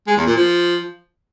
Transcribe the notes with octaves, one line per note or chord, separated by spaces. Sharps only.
G#3
E2
A#2
F3